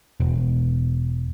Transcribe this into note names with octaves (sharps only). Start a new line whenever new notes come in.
E1